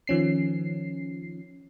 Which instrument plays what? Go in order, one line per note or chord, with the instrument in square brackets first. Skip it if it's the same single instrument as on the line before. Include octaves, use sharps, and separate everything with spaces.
[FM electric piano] D#3 F3 C#4 C7